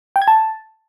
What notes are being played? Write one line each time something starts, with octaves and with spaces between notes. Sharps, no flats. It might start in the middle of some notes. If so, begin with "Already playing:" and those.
G5
G#6
A5